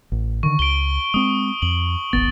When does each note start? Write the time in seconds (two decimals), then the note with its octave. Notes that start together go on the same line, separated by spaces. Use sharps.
0.12 A1
0.43 D3 D#3 C#6
0.59 C#2 D7 G7
1.14 G#3 C4 D#6
1.62 F2 F#7
2.13 D1 G#1 B3 A6